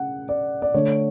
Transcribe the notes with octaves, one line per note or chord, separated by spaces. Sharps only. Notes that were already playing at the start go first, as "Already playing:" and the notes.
Already playing: C#3 F#5
D5
D5
D3 A3 C#5